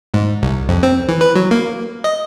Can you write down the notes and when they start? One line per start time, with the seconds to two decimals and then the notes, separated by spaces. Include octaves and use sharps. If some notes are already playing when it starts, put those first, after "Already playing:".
0.14 G#2
0.42 C2
0.69 F2
0.83 C4
1.09 E3
1.21 B4
1.35 F#3
1.51 A#3
2.04 D#5